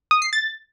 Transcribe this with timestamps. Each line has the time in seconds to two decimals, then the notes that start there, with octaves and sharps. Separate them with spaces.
0.11 D#6
0.22 C7
0.33 A6